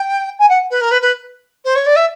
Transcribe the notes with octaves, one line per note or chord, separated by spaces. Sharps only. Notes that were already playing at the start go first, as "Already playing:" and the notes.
Already playing: G5
G#5
F#5
B4
A#4
B4
B4
C5
C#5
D5
E5